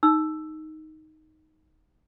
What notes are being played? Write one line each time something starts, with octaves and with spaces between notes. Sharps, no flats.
D#4 E6